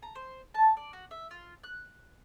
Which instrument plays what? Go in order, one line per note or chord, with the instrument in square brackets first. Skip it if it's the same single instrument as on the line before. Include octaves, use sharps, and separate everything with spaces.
[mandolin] A#5
C5
A5
D5
F#4
E5
F4
F#6